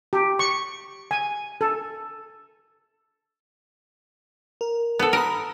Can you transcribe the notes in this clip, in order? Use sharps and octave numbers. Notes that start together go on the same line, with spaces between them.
G4
C#6
G#5
A4
A#4
B3 A4
A#4 B5 D#6